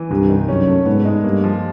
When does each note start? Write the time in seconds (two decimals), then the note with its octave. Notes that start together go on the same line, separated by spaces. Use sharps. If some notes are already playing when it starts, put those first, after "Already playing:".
Already playing: E3
0.10 C2 G2
0.29 D#3
0.48 F#2 C#4
0.68 A3
0.86 G#2 B3
1.05 G#3
1.24 G2 A#3
1.44 F3